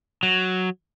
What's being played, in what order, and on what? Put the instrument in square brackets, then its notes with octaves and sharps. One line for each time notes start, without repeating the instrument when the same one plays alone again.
[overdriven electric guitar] F#3